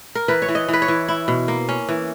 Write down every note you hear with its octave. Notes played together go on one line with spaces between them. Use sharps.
A#4
E3 B4
C#5
E3
D#5
E3 B4
C#5
E3
E4
B2
A#3
C#4
E3